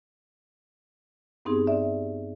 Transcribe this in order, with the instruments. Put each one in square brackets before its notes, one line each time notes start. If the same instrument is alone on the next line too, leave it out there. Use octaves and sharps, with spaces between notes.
[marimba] G2 B3 C4 D#4 G4 G#4
D5 E5